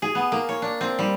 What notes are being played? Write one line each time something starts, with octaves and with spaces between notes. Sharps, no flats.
G#4
B3
A#3
C#5
D4
C4
G3